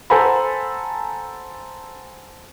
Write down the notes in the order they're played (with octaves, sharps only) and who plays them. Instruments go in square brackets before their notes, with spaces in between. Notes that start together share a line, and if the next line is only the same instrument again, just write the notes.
[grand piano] A4 C5 F#5 G#5 A#5 B5